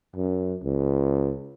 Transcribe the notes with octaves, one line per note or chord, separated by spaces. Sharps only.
F#2
C#2